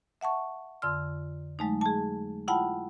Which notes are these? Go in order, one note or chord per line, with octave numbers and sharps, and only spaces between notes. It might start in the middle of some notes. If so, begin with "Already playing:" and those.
E5 F#5 A5 C#6
F2 D3 F4 C6 E6 F6
F#3 G#3 A3 D#4
G#4 A5
E4 F4 F#5 G5 A5 B5